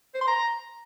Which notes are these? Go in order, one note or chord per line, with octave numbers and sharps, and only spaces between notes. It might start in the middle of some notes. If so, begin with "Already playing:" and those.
C5
C6
A#5